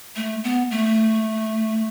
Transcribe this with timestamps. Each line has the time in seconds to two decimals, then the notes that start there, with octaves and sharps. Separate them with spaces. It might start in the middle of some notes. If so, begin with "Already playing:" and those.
0.16 A3
0.44 B3
0.71 A3